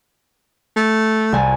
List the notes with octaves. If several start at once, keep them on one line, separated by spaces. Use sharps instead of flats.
A3
C2 G#5 A5